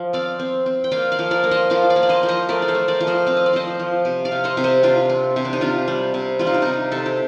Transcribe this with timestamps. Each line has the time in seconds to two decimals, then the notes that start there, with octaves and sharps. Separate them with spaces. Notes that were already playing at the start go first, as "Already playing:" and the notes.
Already playing: F3
0.13 C4 D5 F5
0.39 C4
0.66 C4
0.84 G5
0.91 A#3 D5 F5
1.12 D5 F5
1.19 F3
1.31 A#4 D5
1.44 A#3
1.51 C5 D#5
1.70 F3 D5 F5
1.90 D5 F5
1.96 A#3
2.03 D5
2.09 C5 D#5
2.23 F3
2.28 C5 D#5
2.49 A3 A#4 D5
2.62 D5
2.68 A4 C5
2.75 A3
2.88 A#4 D5
3.00 F3
3.07 C5 D#5
3.27 C4 F5
3.37 D#5
3.46 D5
3.53 F3 C5 D#5
3.79 F3
4.05 C3
4.25 D5 F5
4.32 C3
4.44 C5 D#5
4.57 C3
4.64 C5 D#5
4.83 C3 D4 F4
5.09 C4
5.36 C3
5.45 D4
5.53 D#4
5.61 C3 D4 F4
5.88 G3
6.14 C3
6.39 G3 F4
6.47 D#4
6.54 D4
6.62 C3 D#4
6.92 C3 A4
7.06 G4